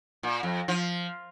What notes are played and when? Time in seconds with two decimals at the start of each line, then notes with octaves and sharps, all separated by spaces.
0.23 A#2
0.43 F2
0.68 F3